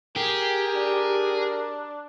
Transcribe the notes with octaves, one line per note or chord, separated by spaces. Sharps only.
G4 G#4 A#4
D4